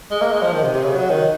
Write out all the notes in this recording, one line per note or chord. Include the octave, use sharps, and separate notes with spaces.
G#3
A#3
G#3
F3
D#3
C3
C3
C#3
F#3
D#3